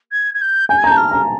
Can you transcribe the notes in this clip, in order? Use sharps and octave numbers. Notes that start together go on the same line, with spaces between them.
G#6
G#6
G6
G#5 G6
G#6
A#5
A5 G6
F6
A#5